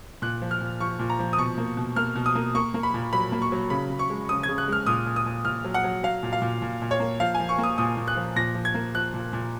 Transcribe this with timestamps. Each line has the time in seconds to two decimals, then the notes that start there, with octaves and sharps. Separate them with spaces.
0.22 A#2 F#6
0.42 F3
0.51 F6
0.61 A#2
0.80 F3 C#6
0.99 A#2
1.10 A#5
1.19 F3
1.33 D#6
1.38 B2 C#6
1.58 A#3
1.77 B2
1.96 A#3 F6
2.15 B2
2.26 D#6
2.35 A#3
2.55 A#3 C#6
2.74 A#3
2.83 B5
2.94 A#2
3.13 F#3 B5
3.32 A#3
3.42 C#6
3.52 F#3
3.70 C#3 B5
3.90 C#3
3.99 C#6
4.10 G#3
4.29 C#3 D#6
4.43 C#3 G#6
4.58 F#6
4.68 G#3 F6
4.86 A#2 D#6
5.06 A#2
5.16 D#6
5.26 A#2
5.45 A#2 F6
5.64 F#3
5.74 F#5
5.84 F#3
6.03 F#3 F5
6.23 A#2
6.33 F5
6.42 A#2
6.62 A#2
6.82 A#2
6.91 C#5
7.00 A#3
7.20 F3 F5
7.34 G#5
7.40 F3
7.49 C#6
7.58 A#3
7.63 D#6
7.78 A#2 D#6
7.97 A#2
8.07 F#6
8.16 F3
8.36 A#2 A#6
8.55 F3
8.65 G#6
8.74 A#3
8.94 F3 F#6
9.14 A#2
9.33 A#2